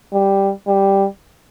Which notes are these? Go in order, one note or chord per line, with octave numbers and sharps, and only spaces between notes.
G3
G3